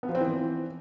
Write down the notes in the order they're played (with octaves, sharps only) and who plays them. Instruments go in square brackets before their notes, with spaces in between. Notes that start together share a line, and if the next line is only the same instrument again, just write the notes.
[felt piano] B3
F3
C4
E3